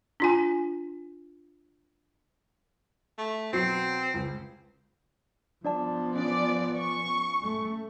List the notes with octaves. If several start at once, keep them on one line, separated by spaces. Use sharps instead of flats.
D4 F4 G#5
A3
B2 F#3 C4 C7
C#2
F3 B3 D4 D5 A5
C#4 D5
C#6
A3